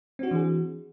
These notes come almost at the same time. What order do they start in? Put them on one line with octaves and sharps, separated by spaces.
C4 F#4 D4 E3 G#4